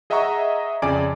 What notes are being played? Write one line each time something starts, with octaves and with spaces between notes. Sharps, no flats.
G#4 D#5 E5 F#5 A#5 C#6
F2 C#3 D5 G#5 D6 D7